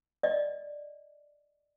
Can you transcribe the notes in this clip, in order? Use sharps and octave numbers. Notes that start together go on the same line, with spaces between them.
D5 D#5